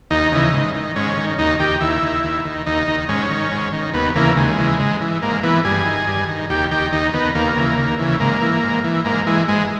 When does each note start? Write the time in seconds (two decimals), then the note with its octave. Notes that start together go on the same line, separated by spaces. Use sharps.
0.10 D#2 D#4
0.32 C#3 E3
0.54 G#2
0.75 D#3
0.96 G#2 C#4
1.17 D#3
1.38 D#2 D#4
1.59 D#3 G4
1.81 D#2 E4
2.02 D#3
2.24 D#2
2.45 D#3
2.66 D#2 D#4
2.88 D#3
3.09 G#2 C#4
3.31 D#3
3.52 G#2
3.73 D#3
3.94 D#2 B3
4.16 C#3 E3 A#3
4.37 D#2 G#3
4.58 C#3 E3
4.79 G#2
5.01 E3
5.22 G#2 A#3
5.43 E3 B3
5.65 G2 G#4
5.86 D#3
6.07 G2
6.29 D#3
6.50 D#2 G4
6.71 D#3 G4
6.92 D#2 D#4
7.14 D#3 B3
7.35 D#2 A#3
7.57 C#3 E3
7.78 D#2
7.99 C#3 E3
8.20 G#2 A#3
8.42 E3
8.63 G#2
8.84 E3
9.05 G#2 A#3
9.27 E3 G#3
9.48 G#2 G#3